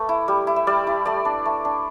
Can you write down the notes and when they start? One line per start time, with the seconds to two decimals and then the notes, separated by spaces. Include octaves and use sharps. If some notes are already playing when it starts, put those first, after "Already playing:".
Already playing: A3 B4 D5
0.09 E4
0.28 G3
0.47 E4
0.56 E5
0.67 G3 D5
0.87 E4
1.06 A3 D5
1.25 D4
1.45 A3
1.65 D4